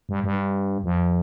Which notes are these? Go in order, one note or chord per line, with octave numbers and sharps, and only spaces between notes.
G2
G2
F2